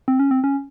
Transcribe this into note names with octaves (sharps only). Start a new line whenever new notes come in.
C4
C#4
C4
C#4